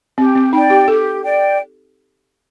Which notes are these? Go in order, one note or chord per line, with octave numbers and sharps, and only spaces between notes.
C4 G4
C4
D#4 D5 G5
G4
G4 A4
D5 G5